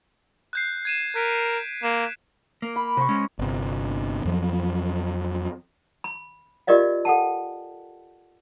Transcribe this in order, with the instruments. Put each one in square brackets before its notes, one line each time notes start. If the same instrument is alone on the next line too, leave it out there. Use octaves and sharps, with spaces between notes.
[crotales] F#6 G6 C7
G#6 D#7 E7
[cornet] A#4 [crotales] F#6 B6 D7
[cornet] A#3 [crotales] E7
[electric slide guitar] A#3
[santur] B5
[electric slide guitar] C3 [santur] C5 C#6
[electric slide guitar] G#3 C#4
[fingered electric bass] G1 C3
F2 F3 F#3
[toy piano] B5
F4 G4 A#4 D5 D#5 F5
A4 F#5 G5 A5